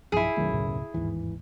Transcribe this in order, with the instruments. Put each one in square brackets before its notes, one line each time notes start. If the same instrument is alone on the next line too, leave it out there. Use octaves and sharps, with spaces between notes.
[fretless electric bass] B1 G2 F3 [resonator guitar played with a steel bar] E4 G#4
[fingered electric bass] B1 F#2 [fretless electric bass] D#3 A3
[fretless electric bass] D2 A2 C#3
[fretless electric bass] G1 D#2 G#2 [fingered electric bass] E3